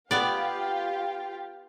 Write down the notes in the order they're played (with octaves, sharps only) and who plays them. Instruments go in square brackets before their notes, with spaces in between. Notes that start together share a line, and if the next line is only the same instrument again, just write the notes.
[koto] B3 D5 [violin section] F4 G4 F5